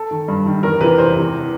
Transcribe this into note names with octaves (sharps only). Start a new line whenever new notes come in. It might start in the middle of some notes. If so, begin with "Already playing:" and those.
Already playing: A4
D#3
G2
D#3
E2 A#4
C3 E3 B4
E2 C5
C3 E3